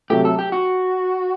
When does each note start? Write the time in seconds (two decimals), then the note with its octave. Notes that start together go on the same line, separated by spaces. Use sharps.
0.10 C3 F#3 A3 G4
0.25 A4
0.39 G4
0.52 F#4